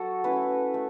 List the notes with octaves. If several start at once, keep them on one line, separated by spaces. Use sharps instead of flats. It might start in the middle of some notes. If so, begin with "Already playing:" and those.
Already playing: F#3 F#4 A4
A3 C#4 E4 B4
A3